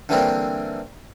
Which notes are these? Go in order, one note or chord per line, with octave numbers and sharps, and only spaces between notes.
D3 E3 G3 A#3 C4 D4